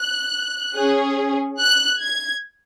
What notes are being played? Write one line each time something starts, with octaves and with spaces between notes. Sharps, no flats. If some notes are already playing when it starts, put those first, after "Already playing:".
Already playing: F#6
C#4 G#4
F#6
G#6